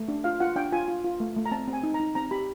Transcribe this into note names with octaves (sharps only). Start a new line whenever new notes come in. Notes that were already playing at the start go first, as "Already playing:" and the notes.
Already playing: A3
D4
F4 F5
F4 F#5
D4 G5
F4 G#5
F4
F4
A3
A3
A#5
C4 A5
C4
G#5
D#4
A#5
D#4
C4 A#5
G4 B5